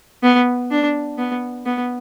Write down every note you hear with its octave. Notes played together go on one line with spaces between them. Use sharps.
B3
D4
B3
B3